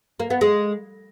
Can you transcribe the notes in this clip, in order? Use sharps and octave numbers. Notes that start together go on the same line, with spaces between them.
A#3
B3
G#3